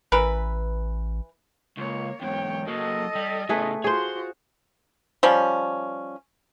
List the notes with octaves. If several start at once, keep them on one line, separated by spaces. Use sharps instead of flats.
A1 E3 A#4 B4
C#2 A#3 C#5
E2 G#2 C#5 G5
F#3 A#3 A4 D#5
G3
A2 C#3 A3 G#4 B4
F4 F#4 G#4 C5 C#5 C6
F3 G3 C#4